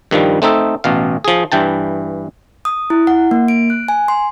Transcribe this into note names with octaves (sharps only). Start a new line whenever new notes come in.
G2 D#3 F3 G3
A3 C4 D#4 A4
A1 B2 F5
F3 G#4
G2 E3 G5 A5
D#6
E4
F#5
A#3
D7
F#6
G#5
C6